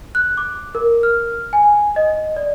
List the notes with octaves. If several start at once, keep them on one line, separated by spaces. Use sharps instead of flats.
F#6
D6
A#4
F6
G#5
D#5
D5